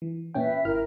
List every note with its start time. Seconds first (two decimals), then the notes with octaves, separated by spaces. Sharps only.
0.02 E3
0.34 A#2 C#4 B4 E5 G5
0.65 G1 E4 A#4 F6